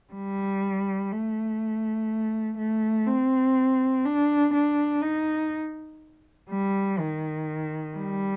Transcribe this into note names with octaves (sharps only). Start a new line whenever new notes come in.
G3
A3
A3
C4
D4
D4
D#4
G3
D#3
G3